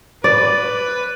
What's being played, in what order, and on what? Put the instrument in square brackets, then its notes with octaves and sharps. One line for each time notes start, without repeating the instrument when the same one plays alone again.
[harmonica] B4 [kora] D5